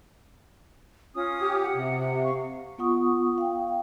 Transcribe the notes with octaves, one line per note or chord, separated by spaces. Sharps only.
C#4 F4 D#6
G4
F#5
C3
F5 C#6
B3 F4 F#5 C#6 D#6
F5 G5